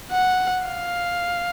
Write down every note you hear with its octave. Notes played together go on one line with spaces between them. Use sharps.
F#5
F5